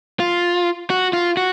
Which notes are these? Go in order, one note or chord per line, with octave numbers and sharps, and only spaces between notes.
F4
F#4
F4
F#4